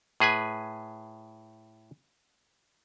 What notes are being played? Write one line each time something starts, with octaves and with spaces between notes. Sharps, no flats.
A2 G#4 B4 G#5